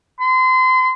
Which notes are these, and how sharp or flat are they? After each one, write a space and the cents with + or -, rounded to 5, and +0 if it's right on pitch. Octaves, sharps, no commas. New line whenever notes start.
C6 -30